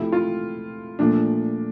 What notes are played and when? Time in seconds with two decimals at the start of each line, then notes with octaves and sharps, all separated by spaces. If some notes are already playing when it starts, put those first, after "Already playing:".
Already playing: C3 F3 A3 E4
0.12 F4
0.99 A#2 F3 A3 D4